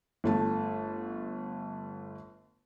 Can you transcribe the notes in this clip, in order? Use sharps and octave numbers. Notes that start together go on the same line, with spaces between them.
G1 A3 A5